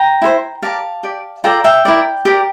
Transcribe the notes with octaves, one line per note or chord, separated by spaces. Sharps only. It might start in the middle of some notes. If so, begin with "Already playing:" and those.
Already playing: G5 A#5
E4 A4 C5
G4 A#4 D5 F5 A5
G4 D5
F4 A4 D5 G5 A#5
E5 G5
E4 A#4 D5
G4 A#4 D5